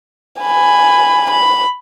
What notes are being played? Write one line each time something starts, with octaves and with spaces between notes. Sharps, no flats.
G#5 B5
B5